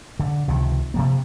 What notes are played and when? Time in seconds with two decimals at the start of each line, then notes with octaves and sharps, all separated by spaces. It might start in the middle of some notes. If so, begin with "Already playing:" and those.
0.19 D3
0.48 C#2 C3 D#3 F3
0.94 C3 F3 A#3